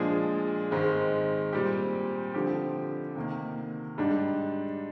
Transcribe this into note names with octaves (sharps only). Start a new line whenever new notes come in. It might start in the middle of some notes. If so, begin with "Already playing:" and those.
Already playing: A#2 F3 G#3 D4 G#4
G#2 D#3 G#3 C4
A#2 G3 C4 G4
D3 F3 C4 G4
C3 D#3 A#3
G#2 G3 D4